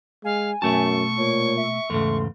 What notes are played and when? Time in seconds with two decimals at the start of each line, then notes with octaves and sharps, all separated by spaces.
0.24 G#3 F5 G#5
0.62 F#2 B2 A3 A5 C#6
1.18 A#2 C#5
1.57 E5
1.90 E2 G#2 C#3 A3 C6